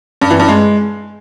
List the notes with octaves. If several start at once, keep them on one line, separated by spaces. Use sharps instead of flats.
G2
E3
G2
G#3